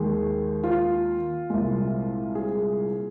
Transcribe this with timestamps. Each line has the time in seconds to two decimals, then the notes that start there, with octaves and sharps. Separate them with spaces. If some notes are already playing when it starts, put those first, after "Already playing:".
Already playing: D#2 D#3 G#3 G#4
0.64 F4
1.50 C2 A#2 G#3
2.35 G#4